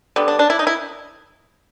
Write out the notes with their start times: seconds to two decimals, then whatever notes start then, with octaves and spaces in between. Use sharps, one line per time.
0.16 D3 G3 B3
0.28 D4
0.39 D4
0.50 E4
0.59 D#4
0.67 E4